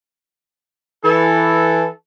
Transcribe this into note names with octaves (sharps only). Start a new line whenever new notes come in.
E3 A4